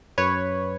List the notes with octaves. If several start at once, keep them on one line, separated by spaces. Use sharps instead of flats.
F#2 B4 C#5